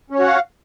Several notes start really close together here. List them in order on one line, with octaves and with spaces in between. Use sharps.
C#4 C#5 F#4 F#5 F5